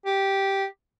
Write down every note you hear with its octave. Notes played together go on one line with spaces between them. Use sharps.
G4